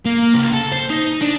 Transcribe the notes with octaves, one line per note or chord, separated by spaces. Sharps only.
A#3
C#2
A4
C5
D#4
D4